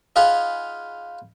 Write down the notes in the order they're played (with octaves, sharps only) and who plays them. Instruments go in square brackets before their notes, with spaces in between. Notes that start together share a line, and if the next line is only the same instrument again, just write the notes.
[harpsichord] D#4 F4 G#4 F5 F#5 B5